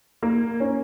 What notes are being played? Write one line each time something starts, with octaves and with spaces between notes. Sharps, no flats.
A#3
C#4